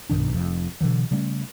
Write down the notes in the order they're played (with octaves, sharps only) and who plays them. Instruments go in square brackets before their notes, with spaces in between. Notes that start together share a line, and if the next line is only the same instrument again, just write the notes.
[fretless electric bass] B1 G2 D#3 D4
F1 F2
B2 D3 E3 F#3
C#3 G3 A3 C#4